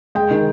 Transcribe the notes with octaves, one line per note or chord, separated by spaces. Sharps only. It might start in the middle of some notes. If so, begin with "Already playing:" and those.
G#3 G5
D#3